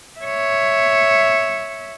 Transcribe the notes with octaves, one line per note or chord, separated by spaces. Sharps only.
C#5 E5